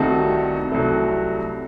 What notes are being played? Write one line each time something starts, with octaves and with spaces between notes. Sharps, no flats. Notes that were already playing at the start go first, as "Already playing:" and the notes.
Already playing: C2 C3 D#3 A3 F#4 A4
C2 C3 F#3 A3